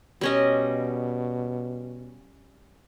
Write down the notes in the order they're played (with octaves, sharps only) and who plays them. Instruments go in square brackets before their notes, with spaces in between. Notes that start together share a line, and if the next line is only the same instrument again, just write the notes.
[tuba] B2 [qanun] G3 C#4 D#5